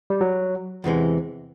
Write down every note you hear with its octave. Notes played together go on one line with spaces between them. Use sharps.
G3
F#3
E2 C3 E3 G#3